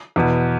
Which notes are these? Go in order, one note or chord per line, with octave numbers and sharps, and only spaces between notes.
E2 B2